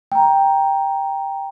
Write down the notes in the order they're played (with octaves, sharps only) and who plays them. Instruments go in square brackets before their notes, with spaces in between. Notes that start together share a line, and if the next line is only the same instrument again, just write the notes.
[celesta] G5 A#5